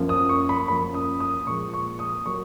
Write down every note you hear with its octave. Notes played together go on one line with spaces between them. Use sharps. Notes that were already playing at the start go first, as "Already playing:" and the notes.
Already playing: F#2 F3 A#3
D#6
C#6
B5
F#2 F3 A#3 B5
D#6
D#6
A#2 F3 G#3 C#6
C#6
D#6
F#3 A#3 C#6